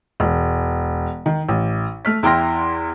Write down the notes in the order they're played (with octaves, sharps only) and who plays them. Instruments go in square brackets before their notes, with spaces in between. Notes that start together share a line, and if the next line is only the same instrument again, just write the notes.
[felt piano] E1
D#3
A1
A3 F6 B6
E2 E4 G5 C6 F6 A#6